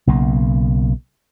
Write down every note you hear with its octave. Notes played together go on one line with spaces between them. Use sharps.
B1 C#3 A#3